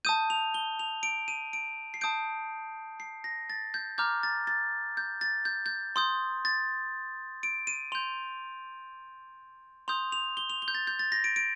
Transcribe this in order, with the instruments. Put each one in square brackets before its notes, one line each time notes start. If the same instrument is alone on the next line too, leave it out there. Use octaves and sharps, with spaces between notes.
[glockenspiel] A5 D#6 G6 D#7
F7
G7
F7
D7
D#7
D7
C7
A5 D#6 G6 D7
C7
A#6
A6
G6
A#5 D6 F6 G6
A6
A6
G6
A6
G6
G6
C6 D#6 G6
A6
D7
D#7
C6 G6 F7
C6 D#6 G6 F7
F7
G7
F7
G7
G6
A6
G6
A6
A#6
D7
D7